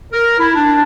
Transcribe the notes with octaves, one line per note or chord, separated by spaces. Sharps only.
A#4
E4
D4